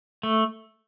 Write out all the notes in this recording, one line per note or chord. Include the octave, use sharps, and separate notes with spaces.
A3